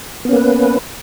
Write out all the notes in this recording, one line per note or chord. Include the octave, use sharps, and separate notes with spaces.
A#3 B3 C#4 B4